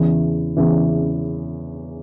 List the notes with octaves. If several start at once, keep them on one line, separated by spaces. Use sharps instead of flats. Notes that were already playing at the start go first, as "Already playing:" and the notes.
Already playing: E2 C#3 E3
E2 C#3 E3